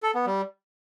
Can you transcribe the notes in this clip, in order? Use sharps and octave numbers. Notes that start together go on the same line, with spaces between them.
A4
B3
G3